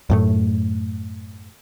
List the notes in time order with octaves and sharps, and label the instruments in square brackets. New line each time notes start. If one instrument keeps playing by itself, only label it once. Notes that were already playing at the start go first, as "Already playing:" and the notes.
[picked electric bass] F#2 A2 A3